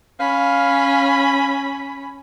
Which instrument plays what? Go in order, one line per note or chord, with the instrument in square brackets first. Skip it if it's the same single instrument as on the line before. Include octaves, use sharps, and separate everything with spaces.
[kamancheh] C#4 B5 [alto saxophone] F5